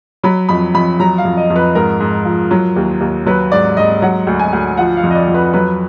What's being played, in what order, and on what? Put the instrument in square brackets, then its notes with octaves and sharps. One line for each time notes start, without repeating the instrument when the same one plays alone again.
[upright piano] F#3 B5
F2 B5
F2 B5
F#3 A#5
F5
F2
D#5
F2
B4
G#2 A#4
G#2
F3
F#3
D#2
D#2
F#3 B4
G#2 D5
G#2 D#5
F#3 F#5
D2
G#5
D2
F3 F#5
F5
F2
D#5
D5
F2
B4
F#3 B4